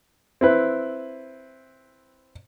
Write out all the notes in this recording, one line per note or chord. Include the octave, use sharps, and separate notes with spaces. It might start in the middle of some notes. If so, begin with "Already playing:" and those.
C4 E4 B4